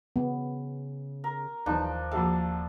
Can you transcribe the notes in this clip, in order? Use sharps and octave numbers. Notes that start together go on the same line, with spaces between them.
C#3 B3
A#4
D#1 E3 F3 D4 D#4
A#1 F#4 A4 F5